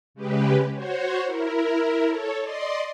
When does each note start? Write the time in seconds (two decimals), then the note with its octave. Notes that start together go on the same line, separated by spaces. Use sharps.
0.14 C#3 G#3 G4 B4
0.75 F#4 C5 C#5
1.25 E4 A#4
2.06 A4 C#5
2.41 D5 D#5 C6